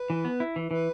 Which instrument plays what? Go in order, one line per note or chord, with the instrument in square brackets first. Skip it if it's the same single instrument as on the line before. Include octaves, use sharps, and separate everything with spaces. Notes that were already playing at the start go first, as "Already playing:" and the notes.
Already playing: [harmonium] B4
[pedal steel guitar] E3
B3
E4
E3
[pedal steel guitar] E3 [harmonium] B4